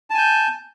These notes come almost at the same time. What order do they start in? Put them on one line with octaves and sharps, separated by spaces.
A5 G#5 G6